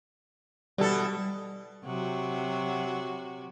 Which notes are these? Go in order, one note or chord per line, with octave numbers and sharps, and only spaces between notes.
B2 E3 G3 A4
C3 F#3 F#4